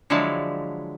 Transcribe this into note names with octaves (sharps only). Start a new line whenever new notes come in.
D3 F3 F#3 G#3 E4 A5